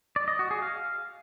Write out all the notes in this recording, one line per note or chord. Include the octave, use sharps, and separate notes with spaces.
D5
D#5
F#4
G#4
F5